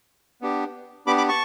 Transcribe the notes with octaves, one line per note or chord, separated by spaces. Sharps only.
B3 D4 G4
B3 D4 G4 B5 D6
B5 D6
A5 C#6